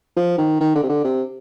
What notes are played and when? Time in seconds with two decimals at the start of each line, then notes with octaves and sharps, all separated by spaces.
0.16 F3
0.38 D#3
0.60 D#3
0.76 D3
0.83 C3
0.89 D3
1.04 C3